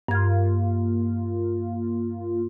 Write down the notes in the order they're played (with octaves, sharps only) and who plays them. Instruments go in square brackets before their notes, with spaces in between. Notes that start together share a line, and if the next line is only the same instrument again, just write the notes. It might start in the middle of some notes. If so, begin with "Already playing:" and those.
[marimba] G2 G#6 [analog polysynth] A#3 F4